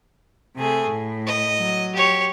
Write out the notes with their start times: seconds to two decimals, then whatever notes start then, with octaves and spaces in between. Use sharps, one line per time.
0.56 C3 A3 G#4
0.88 A2
1.27 D#5
1.57 F#3
1.94 G4 C#5